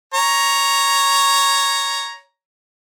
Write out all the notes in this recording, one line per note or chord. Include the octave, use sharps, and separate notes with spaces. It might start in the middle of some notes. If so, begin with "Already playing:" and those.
C#5 A#5